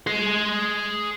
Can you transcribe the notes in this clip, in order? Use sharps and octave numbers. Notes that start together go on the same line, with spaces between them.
G#4 C6